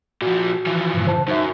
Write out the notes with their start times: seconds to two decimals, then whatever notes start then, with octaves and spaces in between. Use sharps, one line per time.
0.22 A#2 F3 F#4
0.66 E3 F3
0.94 G2 A#2
1.06 C#3 C5 A5
1.28 F#2 D#4 E5